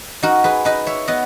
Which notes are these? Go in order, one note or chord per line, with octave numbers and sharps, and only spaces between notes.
D#4 F#4 A#4
G#4 B4
D#4 B4 D#5
C#5 E5
B3 D#5 F#5